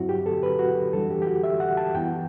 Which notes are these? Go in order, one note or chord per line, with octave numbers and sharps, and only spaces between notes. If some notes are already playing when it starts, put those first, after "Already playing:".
Already playing: G2 F#3 C4 E4 F#4
G4
A4
B4
F#4
F#2 E3 G3 D4 A4
G4
G4
F#4
E5
F#5
A5
F#2 E3 B3 E4 G5